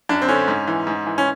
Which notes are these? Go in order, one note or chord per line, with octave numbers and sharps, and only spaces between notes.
F#2 D4
C4
D3 C#4
G#2
E3
G#2
E3
C#4